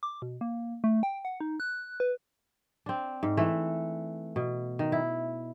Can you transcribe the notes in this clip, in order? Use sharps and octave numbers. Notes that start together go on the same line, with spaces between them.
D6
B2
A#3
A3
G5
F#5
D#4
F#6
B4
C4 D4
G#2
E3 A3
B2
D#3
E4